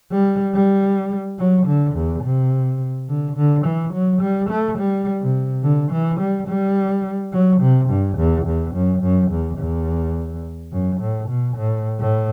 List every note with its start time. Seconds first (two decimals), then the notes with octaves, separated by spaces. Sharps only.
0.12 G3
0.54 G3
1.39 F#3
1.67 D3
1.96 E2
2.24 C3
3.09 D3
3.36 D3
3.65 E3
3.94 F#3
4.22 G3
4.50 A3
4.79 G3
5.21 C3
5.63 D3
5.92 E3
6.20 G3
6.48 G3
7.33 F#3
7.61 C3
7.89 G2
8.18 E2
8.47 E2
8.75 F#2
9.03 F#2
9.31 E2
9.59 E2
10.72 F#2
11.01 A2
11.29 B2
11.57 A2
12.00 A2